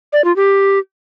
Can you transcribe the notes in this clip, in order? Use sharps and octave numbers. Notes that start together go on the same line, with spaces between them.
D5
F4
G4